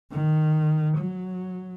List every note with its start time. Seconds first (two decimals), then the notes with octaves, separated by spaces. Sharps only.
0.11 D#3
0.97 F#3